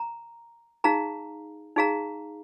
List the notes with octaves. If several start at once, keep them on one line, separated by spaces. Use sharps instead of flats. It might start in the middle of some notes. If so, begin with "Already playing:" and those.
Already playing: A#5
D#4 G#4 F5 A#5
D#4 G#4 F5 A#5